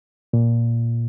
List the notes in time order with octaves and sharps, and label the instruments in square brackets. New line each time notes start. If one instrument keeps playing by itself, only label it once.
[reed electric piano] A#2